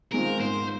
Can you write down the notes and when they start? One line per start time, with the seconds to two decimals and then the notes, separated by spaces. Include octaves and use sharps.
0.12 D#3 G#3 C4 F4 A#4
0.40 G#2 C5